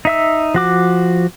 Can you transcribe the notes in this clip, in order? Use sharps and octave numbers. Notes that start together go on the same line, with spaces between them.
D#4 E5 E6
F3 F#4 D6